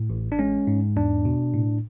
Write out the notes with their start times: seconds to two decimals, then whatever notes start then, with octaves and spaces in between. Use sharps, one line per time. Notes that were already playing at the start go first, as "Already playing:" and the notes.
Already playing: A2
0.10 A1
0.32 D4
0.39 G#3 C#4
0.67 G#2
0.96 E2 D4
1.25 B2
1.54 A2